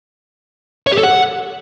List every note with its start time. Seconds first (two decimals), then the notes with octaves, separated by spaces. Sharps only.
0.87 C#5
0.92 G4
0.98 A4
1.03 F#5